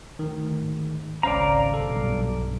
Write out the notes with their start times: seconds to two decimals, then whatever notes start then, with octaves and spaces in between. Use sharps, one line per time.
0.19 D2 D#3
0.60 G#2
1.23 G#1 C#2 G#2 C#4 C5 D5 F5 A#5
1.74 B1 G2 A4